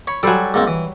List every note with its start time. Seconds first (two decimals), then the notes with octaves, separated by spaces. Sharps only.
0.07 C#5 B5
0.23 F#3 G3 A4 C5 G#5
0.54 G#2 A#3 C4
0.67 E3